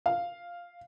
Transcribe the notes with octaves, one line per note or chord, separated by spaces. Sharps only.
F5